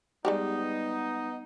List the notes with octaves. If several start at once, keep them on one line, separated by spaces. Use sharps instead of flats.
G3 G#3 B3 D#4 G4